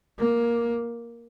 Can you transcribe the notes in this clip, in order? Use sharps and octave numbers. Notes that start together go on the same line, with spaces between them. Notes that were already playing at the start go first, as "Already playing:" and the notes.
A#3